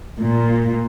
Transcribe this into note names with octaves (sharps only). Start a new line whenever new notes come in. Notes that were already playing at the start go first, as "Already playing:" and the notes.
A#2